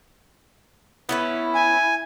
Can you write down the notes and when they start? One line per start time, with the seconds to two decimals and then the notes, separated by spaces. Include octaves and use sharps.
1.09 B3 C#4 E4 B4
1.55 G#5